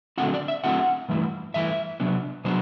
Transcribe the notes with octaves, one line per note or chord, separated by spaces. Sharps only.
D3 F#3 A3 C4 E4 F#5
D5
E5
D3 F#3 A3 C4 E4 F#5
G2 E3 A3 E4
G2 E3 A3 E4 E5
C3 F#3 B3 D4
C3 F#3 B3 D4 C5